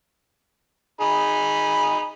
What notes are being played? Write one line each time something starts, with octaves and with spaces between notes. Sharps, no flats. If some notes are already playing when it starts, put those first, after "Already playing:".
D#4 G#4 B5